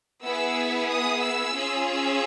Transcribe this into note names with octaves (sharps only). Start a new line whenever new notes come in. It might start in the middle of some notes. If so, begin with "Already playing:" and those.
B3 E4 G#4 E6
D#6
E6
C#4 F4 G#4
E6